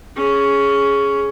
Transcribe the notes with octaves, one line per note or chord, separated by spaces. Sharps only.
C#4 G#4